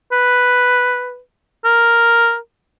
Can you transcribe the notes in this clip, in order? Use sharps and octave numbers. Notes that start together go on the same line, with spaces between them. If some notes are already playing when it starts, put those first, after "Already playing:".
B4
A#4